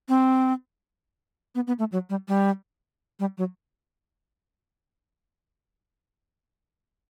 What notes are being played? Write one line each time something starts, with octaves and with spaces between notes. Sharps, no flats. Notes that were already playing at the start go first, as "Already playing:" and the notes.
C4
B3
B3
A3
F#3
G3
G3
G3
F#3